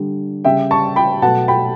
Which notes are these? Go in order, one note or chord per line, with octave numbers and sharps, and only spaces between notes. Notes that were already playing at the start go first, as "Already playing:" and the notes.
Already playing: D3 G3
C#3 G3 E5 G5
A5 C#6
G5 B5
B2 F#3 A3 F#5 A5
G5 B5